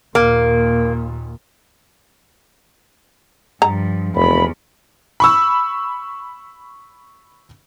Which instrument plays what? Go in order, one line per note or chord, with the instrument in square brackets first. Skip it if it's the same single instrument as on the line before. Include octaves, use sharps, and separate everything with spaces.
[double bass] D#2 A#2 [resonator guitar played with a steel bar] A#3
[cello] G2 F3 [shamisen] A#5
[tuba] F1 [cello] E2 [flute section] B5
[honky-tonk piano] B5 C#6 E6